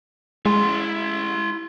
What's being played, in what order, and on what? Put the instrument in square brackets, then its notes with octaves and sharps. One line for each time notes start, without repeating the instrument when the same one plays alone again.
[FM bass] G#3 [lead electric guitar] E4 C6